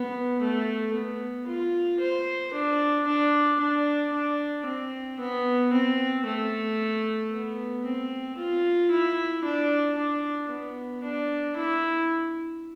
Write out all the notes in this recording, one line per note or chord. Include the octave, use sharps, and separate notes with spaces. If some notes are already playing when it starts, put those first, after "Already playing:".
Already playing: B3
A3
B3
F4
C5
D4
D4
D4
D4
C4
B3
C4
A3
B3
C4
F4
E4
D4
D4
B3
D4
E4